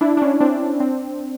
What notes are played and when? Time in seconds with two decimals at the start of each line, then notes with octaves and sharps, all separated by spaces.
0.01 D4 E4
0.17 D4
0.22 C#4
0.40 C4 D4
0.80 C4 D4